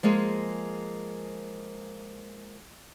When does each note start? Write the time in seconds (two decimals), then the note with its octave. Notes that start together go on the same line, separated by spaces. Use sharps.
0.03 F3 G#3 A#3 G#4